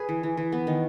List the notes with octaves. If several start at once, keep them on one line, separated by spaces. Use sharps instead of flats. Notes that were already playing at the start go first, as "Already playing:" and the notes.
Already playing: G#4 B4
E3
E3
E3
B3
D#3